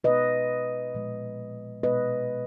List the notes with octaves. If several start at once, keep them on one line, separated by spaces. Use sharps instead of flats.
B2 G#3 B3 B4 D#5
A#2 F3 G#3
B2 G#3 B3 B4 D#5